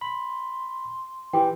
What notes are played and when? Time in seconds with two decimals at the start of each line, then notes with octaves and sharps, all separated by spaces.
0.01 B5 C6
1.33 E3 G4 G5